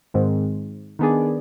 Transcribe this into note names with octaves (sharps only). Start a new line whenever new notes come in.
G#2 D#3 G#3 C4
D#3 B3 D4 G#4 D5